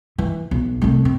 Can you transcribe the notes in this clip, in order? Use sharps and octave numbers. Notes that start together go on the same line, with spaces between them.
E3
B1
C2 A3
C4